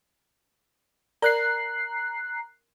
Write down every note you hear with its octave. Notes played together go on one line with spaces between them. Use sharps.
A#4 D5 A#5 F#6 C7